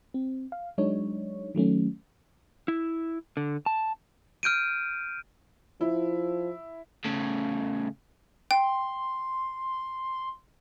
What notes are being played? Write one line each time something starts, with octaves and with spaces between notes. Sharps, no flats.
C4
F5
F#3 G#3 D4 D#4 C#5
D#3 F#3 A3 C#4
E4
D3
A5
F6 G6 D7 D#7
F3 E4
A2 C#3
G5 C6